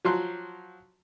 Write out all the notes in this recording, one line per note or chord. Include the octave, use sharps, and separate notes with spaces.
F3 F#3 C6 F#6